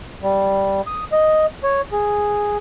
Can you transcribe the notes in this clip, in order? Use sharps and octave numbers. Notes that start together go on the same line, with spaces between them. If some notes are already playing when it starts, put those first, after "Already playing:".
G3
D#6
D#5
C#5
G#4